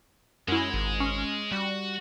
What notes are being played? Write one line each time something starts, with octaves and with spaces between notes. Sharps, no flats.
F#2 G#3 C#4 E4
G#1
C#4
G3 F#4 F#5